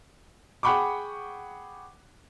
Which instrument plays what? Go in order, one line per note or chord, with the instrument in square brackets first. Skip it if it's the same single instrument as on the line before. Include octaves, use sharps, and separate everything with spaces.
[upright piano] G#4 F#5 G5 B5 C#6 D6